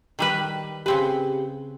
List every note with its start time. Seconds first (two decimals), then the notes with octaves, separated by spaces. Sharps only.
0.19 D#3 G3 B4
0.86 C#3 C4 G4 B4